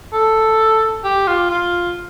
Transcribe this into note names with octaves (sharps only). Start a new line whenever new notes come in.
A4
G4
F4
F4